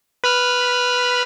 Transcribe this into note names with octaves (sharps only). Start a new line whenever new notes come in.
B4 B5 F6